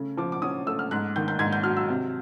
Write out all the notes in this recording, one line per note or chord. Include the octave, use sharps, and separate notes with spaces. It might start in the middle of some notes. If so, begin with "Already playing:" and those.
Already playing: C#3 A3
F3 D6
D6
C#4 D#6
A3 E6
F6
G#2 F#6
D#3 G6
G6
G#2 G#6
G6
F#3 F6
E6
C3